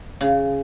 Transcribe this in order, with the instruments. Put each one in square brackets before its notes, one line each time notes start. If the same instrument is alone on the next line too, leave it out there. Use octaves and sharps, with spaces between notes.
[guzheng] C#3